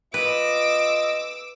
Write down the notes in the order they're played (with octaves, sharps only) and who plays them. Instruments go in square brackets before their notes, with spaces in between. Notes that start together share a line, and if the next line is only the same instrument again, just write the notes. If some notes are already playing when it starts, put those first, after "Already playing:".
[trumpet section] F4 D#5 [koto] B4 [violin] D6 E6